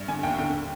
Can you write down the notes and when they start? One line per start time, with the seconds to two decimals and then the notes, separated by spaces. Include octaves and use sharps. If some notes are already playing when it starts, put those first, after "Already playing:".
Already playing: G2
0.08 D3 G#5
0.23 D#2 G5
0.39 D3